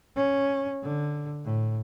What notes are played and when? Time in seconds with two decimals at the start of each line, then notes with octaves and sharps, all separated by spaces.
0.16 C#4
0.83 D3
1.44 A2